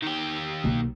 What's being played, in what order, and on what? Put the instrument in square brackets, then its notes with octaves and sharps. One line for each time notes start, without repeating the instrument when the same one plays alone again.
[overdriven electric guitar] D#3 G4
[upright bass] B1 A#3